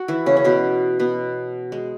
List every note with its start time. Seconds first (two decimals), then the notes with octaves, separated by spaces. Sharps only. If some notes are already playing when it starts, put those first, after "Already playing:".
Already playing: F#4
0.08 E3 E4
0.26 C#3 C#4
0.37 C#4
0.44 B2 B3
1.00 B2 B3
1.72 G#3